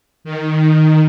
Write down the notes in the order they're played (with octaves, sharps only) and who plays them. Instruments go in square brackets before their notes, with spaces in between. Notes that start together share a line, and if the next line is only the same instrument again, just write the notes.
[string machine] D#3